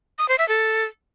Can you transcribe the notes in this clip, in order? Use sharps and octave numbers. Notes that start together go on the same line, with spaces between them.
D#6
C5
E5
A4